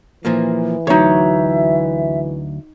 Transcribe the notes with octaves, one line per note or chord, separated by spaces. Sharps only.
A#2 E3 F3 A#3
D2 F#3 D#4 C#5 E5